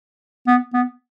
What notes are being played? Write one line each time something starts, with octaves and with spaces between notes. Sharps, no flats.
B3
B3